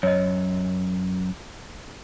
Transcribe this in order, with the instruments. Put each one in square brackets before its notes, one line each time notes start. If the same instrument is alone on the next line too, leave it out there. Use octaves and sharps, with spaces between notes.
[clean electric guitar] F#2 [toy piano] C#5 D#5